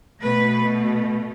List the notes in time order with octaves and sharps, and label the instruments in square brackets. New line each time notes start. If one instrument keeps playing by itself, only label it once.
[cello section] B2 A3 B4